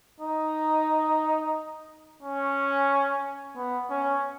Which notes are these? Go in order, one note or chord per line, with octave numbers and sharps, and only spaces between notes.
D#4
C#4
B3
C#4